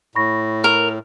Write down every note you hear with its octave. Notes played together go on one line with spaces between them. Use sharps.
A2 B5 C#6 A#6
A#4